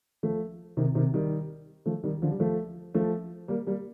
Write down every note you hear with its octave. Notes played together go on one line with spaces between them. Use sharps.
F3 A3
C3 D#3
C3 D#3
D#3 G3
F3 A3
D#3 G3
D3 F3
G3
F3 A3
F3 A3
G3 A#3
G3 A#3